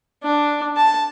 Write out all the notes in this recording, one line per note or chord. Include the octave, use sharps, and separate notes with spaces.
D4
A5